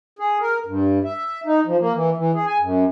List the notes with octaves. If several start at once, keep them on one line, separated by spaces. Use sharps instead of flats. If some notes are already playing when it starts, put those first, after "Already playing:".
G#4
A#4
G2
E5
D#4
F3
A#3
E3
E3
G#4
G#5
F#2